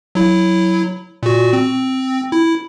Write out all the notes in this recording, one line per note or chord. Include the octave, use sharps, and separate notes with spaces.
F#3 E4
A#2 F#4
C4
E4